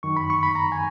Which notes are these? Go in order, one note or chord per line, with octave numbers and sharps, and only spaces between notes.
F#2 D#3 C#6
B5
C#6
B5
A#5
G#5